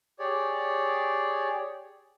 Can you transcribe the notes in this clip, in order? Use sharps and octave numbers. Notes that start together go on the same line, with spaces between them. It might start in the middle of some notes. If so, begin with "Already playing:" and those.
G4 G#4 C#5 D5